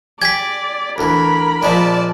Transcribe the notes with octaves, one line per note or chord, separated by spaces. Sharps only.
G4 D5 G#5 G#6 B6
D2 E3 A#4 B5
A#2 F3 G#3 D5 A5